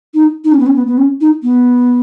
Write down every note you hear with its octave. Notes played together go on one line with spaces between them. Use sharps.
D#4
D#4
C#4
B3
C#4
B3
B3
C#4
D#4
B3